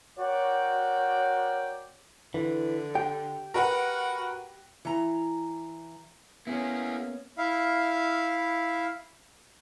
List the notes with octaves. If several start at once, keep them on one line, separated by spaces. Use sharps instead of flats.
F#4 A#4 C#5 D5 G5
D3 E3
G4 G5
F#4 A#4 B4 F#5
E3 A#5
A#3 B3 C#4 E4 G#4
E4 E5 F5